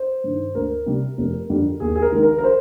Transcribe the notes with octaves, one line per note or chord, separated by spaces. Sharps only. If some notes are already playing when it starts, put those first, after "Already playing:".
Already playing: C5
G2 D#3
D2 A#4
C3 G3
F1
F2 D3 G3
D#2 G#4
G#4
A#4
D#3 G#3
A#4
A#4
C5